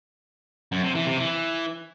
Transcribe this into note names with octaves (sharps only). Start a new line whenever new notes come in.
F#2
C3
E3
C3
E3